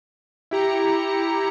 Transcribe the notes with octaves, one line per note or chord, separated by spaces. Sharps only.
E4 G4 A#5 C#7